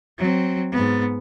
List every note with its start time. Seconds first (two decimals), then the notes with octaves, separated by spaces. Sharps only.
0.19 F#3 C4
0.72 G#2 B3